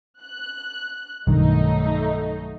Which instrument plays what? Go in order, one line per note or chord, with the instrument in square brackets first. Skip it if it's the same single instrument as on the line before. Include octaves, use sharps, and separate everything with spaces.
[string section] F#6
[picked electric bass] B1 G2 D#3 [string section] F#3 A3 D#4